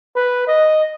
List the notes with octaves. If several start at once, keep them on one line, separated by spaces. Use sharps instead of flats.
B4
D#5